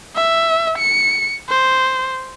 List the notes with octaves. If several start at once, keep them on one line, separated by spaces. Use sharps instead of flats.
E5
C#7
C5